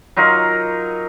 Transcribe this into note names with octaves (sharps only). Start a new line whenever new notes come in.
F#3 D#4 F4 A#4